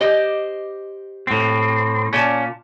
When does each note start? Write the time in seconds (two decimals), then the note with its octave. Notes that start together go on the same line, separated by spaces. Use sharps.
0.01 G4 C5 D#5
1.27 A2 C4
2.13 A#2 C#4 F4 A5